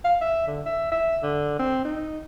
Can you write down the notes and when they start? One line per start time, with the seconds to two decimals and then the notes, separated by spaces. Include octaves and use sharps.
0.04 F5
0.21 E5
0.47 D3
0.66 E5
0.92 E5
1.23 D3
1.59 C4
1.85 D#4